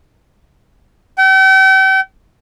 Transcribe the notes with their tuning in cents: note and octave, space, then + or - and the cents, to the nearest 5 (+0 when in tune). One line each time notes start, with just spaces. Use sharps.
G5 -40